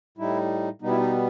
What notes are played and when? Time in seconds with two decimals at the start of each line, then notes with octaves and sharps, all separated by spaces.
0.18 A2 G3 D#4 E4
0.82 B2 G3 B3 D#4
0.89 E4
0.98 D#4